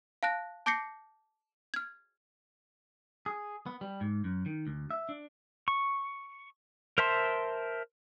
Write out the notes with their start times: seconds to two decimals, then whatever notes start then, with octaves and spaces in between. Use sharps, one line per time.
0.23 F5 A5 F#6 A#6
0.66 A5 D6 G6 A#6 C7 C#7
1.74 F6 G#6
3.26 G#4
3.66 B3
3.81 G3
4.01 G#2
4.24 F#2
4.46 D#3
4.67 D2
4.91 E5
5.09 D4
5.68 C#6
6.98 A#4 C5 E5 A5 C6